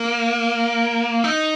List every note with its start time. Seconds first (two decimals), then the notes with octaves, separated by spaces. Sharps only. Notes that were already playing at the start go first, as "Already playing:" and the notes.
Already playing: A#3
1.24 D#4